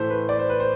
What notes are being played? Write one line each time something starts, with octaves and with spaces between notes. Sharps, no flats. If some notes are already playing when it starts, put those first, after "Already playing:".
Already playing: A2 E3 A3 C5
B4
D5
C5
B4
C5